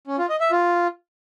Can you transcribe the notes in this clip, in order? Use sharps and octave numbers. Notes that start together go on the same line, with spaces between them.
C#4
F4
D#5
E5
F4